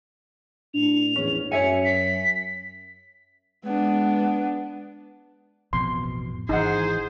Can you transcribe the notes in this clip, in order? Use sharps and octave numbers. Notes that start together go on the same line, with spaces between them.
A2 D4 F7
A#1 E2 C#4
F#2 C#5 E5 G#5 C#7
B6
G#3 B3 D4
A1 F2 B2 C6
G#1 E3 D#4 G#4 C5 F#5